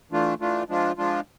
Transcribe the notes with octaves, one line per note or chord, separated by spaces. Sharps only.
E3 A3 D4 F4
E3 A3 D4 F4
F3 G#3 D4 F4
F3 G#3 D4 F4